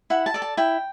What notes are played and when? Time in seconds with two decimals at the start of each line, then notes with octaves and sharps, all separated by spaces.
0.10 E4 F#5
0.26 A5
0.34 A4 D5
0.42 A5
0.57 E4 G5